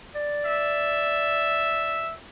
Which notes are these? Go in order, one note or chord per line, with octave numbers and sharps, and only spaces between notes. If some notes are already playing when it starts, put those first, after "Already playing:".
D5
E5